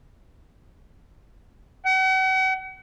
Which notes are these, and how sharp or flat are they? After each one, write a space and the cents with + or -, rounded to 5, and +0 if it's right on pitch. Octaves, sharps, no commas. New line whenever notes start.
F#5 +40